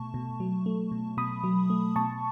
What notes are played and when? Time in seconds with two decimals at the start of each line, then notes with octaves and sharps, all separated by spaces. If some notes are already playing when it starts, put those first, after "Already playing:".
Already playing: B2 A3 A5 C#6
0.14 B2
0.40 F#3
0.66 A3
0.92 B2
1.17 B2 B5 D#6
1.44 F#3
1.70 A3
1.96 B2 A5 C#6